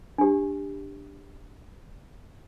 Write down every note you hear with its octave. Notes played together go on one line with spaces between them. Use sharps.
D4 G4